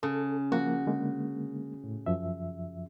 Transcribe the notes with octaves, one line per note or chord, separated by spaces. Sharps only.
C#3 A4
F3 A#3 F#4
D3 G#3 A#3
A2
F#2 F3 E5